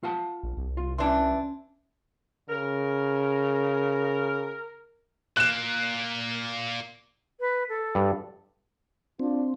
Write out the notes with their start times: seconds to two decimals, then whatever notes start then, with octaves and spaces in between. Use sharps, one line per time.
0.03 F4 F#5 A5
0.43 A#1
0.57 C2
0.77 F4
0.98 E3 C#4 D4 A5 C6
2.50 C#3 A#4
5.37 A#2 A#3 F#6 E7
7.40 B4
7.69 A4
7.95 G2
9.20 C4 D4 F4